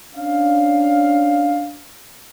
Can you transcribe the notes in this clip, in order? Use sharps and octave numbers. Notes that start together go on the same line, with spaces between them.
C#4 D4 F5